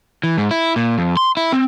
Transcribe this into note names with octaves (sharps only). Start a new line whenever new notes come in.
E3
G#2
E4
A#2
F2
C6
E4
C4